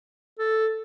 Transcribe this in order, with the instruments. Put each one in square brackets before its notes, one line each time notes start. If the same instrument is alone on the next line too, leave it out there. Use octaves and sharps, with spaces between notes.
[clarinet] A4